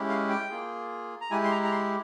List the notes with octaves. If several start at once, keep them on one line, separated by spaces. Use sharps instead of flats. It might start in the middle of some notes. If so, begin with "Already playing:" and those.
Already playing: G#3 C#4 E4 G4
F5
G5
A#3 F4 G#4
A#5
G#3 E4 G4 G#5
C6
A#5
A#5
C6